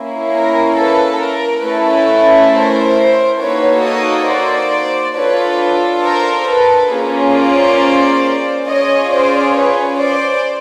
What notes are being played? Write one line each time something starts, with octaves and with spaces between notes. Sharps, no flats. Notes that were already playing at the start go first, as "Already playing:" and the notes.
Already playing: A#3 C#4 E4
A#4
A4 B4
A#4
A3 C#4 E4 A4 B4
A#4 C5
A#3 D#4 F#4 A4 B4 C#5
C#5 D#5
C5 D5
D4 F4 A4 B4 C#5
A#4 C5
A4 B4
A#3 C#4 F4 G#4
C5 D5
C#4 F4 G#4 C#5 D#5
C5 D5
B4 C#5
C5 D5